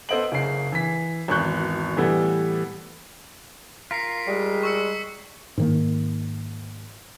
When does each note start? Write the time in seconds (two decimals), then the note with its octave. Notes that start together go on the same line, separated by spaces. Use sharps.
0.09 B3 A4 C5 D#5 D7 F#7
0.32 F#1 C#3 C7
0.72 E3 B6
1.28 G#1 E2 B2 C#6 F#6 G6
1.97 A2 E3 G3 B3 A4
3.91 F4 A#4 B6 C7
4.27 G3 G#3
4.63 C#6 E6 C#7
5.58 G#2 D#3 A#3